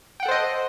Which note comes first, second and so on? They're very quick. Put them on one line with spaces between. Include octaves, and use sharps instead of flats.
G5 F#5 A4 C5 D#5